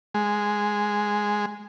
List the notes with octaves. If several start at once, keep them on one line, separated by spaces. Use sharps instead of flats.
G#3